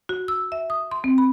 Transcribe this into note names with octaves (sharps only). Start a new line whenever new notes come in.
F#4
E6
E5
D#6
C6
C4
B5